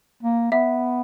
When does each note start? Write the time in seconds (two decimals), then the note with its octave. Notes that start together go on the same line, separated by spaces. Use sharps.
0.23 A#3
0.52 B3 E5